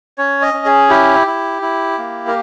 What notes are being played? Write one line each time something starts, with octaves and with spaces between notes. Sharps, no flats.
C#4 C#5
D#5
C#4
G#4
E4 G4
E4
E4
A#3
A#4